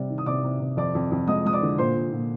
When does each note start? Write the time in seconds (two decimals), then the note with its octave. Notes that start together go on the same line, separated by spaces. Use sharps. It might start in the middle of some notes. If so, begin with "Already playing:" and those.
Already playing: C3 G3 D5
0.10 D#3
0.18 D#6
0.26 C3 D5 D6
0.44 C3
0.60 C3
0.77 F2 D5 D6
0.95 F2
1.12 F2
1.27 G#3 D#5 D#6
1.45 G#3 D#6
1.53 D5 D6
1.62 D3
1.78 A#2 C5 C6
1.96 A#2
2.12 A#2